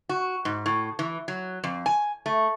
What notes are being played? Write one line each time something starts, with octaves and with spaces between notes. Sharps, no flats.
F#4
G#2
A2
E3
F#3
F2
G#5
A3